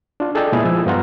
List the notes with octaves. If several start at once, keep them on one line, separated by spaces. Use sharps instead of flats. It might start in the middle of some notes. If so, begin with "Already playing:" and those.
D4 F4
G#4 A4 D5 D#5 G5 A5
A#2 G#3 B3 E4 G#4
F3 G#5 E6
G2 B3 F4 F#5 A#5